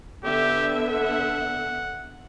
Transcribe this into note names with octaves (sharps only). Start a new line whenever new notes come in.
D3 B3 G4 E5
F#5